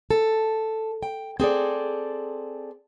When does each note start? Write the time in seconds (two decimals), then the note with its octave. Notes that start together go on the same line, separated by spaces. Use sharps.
0.11 A4
1.03 G5
1.40 C4 G#4 A4 D5